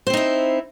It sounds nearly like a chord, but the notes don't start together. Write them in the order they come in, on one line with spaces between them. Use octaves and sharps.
C5 C4 D#4 E4